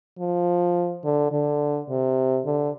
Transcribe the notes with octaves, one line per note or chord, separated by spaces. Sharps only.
F3
D3
D3
C3
D3